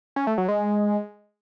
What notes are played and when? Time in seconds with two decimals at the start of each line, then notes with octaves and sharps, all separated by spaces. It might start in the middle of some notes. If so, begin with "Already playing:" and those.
0.16 C#4
0.27 A3
0.38 F#3
0.48 G#3